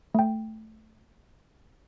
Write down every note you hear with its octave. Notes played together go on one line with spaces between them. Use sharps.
A3 G5